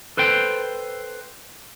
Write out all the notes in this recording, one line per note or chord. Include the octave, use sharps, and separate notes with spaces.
A4 B4 C5 G5